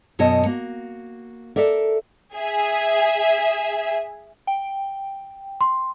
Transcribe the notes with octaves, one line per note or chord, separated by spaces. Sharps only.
F#2 B2 C#5 D#5 A5
A#3 F#4
A4 A#4 D5 E5
G#4 E5
G5
C6